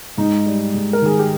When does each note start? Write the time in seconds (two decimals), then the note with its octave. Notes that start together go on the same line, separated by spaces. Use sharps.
0.18 G#2 D#4
0.46 G3
0.74 G#2
0.93 A#4
1.02 D#3 G#4
1.19 G4